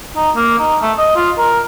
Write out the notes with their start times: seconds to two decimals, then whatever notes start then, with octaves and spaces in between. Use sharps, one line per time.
0.16 D#4
0.36 A#3
0.59 D#4
0.82 A3
0.98 D#5
1.16 F4
1.38 A#4